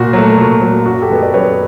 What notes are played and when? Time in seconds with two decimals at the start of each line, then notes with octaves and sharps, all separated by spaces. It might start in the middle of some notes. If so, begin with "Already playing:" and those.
Already playing: A#2 F#4
0.13 F#3 A3
0.38 A#2
0.61 F#3 A3
0.82 F4
0.85 F#2 F#4
1.01 G4 A4
1.10 D#3 G#3 B3
1.23 D5
1.34 F#2 B4 C#5